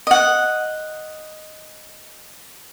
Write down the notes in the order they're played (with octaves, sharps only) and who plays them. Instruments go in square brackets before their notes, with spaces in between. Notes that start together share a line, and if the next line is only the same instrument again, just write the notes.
[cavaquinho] D#5 F#5